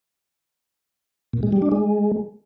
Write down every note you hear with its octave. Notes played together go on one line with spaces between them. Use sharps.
A#2
G#3
G3
D4
G#3